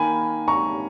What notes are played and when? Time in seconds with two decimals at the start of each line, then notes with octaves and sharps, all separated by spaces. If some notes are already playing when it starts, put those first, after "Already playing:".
Already playing: D#3 A#3 G#5 B5
0.48 A#5 C#6